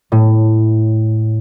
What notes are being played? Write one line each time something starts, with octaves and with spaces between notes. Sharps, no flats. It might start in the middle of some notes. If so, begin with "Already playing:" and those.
A2